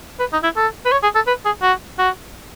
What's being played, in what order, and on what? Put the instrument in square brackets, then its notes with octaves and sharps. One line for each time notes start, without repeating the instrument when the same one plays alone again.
[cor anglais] B4
D#4
E4
A4
B4
C#5
G#4
A4
B4
G#4
F#4
F#4